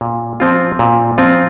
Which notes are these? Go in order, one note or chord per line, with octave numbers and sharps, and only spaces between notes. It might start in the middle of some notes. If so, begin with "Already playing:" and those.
A#2
F3 C4 F4
A#2
F3 C4 F4